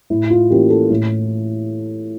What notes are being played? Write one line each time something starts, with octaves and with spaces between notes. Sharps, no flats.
A2 E4
F4
E3 A#3 C#4 G4
A4
A2